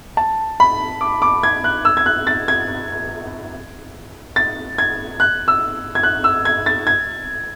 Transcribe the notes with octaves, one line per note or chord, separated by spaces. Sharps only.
A5
B5
D6
D6
G#6
F#6
E6
G#6
F#6
A6
G#6
A6
G#6
F#6
E6
G#6
F#6
E6
G#6
A6
G#6